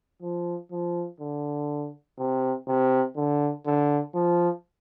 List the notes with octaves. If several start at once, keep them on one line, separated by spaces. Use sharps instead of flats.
F3
F3
D3
C3
C3
D3
D3
F3